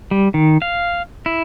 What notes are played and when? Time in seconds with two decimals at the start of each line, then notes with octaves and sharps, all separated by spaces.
0.11 G3
0.34 D#3
0.62 F5
1.26 E4